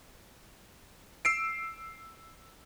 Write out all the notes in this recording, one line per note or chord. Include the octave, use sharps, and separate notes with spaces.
E6 C7 D7